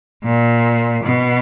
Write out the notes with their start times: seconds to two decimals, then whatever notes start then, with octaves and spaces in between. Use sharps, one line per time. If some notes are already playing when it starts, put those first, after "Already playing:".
0.24 A#2
1.04 B2